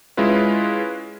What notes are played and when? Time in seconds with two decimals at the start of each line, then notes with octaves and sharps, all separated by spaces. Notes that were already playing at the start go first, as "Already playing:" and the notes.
0.17 G#3 C#4 E4 F4 B4